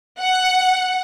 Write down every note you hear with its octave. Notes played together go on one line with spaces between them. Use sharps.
F#5